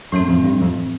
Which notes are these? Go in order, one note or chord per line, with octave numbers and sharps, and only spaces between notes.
F#2 A2 E3 A3 C4
F2
G2
F2